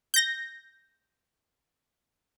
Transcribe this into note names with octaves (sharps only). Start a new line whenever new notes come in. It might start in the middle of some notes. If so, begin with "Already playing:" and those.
G6 A#6